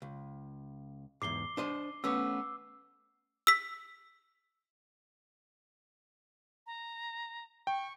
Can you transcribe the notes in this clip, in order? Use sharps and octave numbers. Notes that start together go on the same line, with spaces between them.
C#2
E2 G#2 D6 C7 G7
D4 C5 D#5
A3 B3 C#4 D6 E6
E6 B6
A#5
G5 C#6